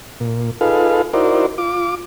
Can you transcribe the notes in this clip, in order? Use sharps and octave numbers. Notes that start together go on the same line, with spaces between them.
A#2
D#4 F4 G#4 A4 B4 F5
D#4 E4 F#4 A#4 C5 D5
F4 D6